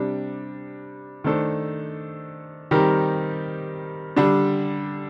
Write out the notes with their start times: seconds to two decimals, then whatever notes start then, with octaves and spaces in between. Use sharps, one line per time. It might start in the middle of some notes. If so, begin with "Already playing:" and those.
Already playing: C3 G3 D4
1.24 D#3 A3 D4 A4 C5
2.71 D#3 G3 C4 G4 A#4
4.16 D3 G3 D4